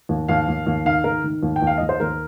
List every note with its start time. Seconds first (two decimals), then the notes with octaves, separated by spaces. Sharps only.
0.09 D#2
0.28 D#2 F5
0.48 D#2
0.67 D#2
0.85 D#3 F5
1.04 D#3 A#4
1.24 D#3
1.43 D#2
1.56 G5
1.62 D#2
1.67 F5
1.78 D#2 D#5
1.89 C5
2.00 D#2 A#4